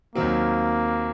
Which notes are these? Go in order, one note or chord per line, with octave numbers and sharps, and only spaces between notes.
D#2 D#3 F#3 A#3 C4